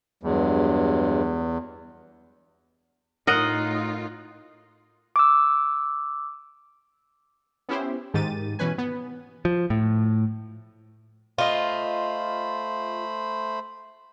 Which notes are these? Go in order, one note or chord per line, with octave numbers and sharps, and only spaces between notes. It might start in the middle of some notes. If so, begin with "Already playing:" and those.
E2 G2 F#3 G#3
A2 D#4 F4 A#4 D#5 F#5
D6 E6
B3 C#4 E4 G4 C5
G#2 D#3 G4 A6 D#7
B2 E3 C#4 B4 G#5
B3
F3
A2
A3 F4 C5 D#5 B5